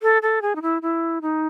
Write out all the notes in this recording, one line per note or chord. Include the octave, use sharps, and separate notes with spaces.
A4
A4
G#4
D#4
E4
E4
D#4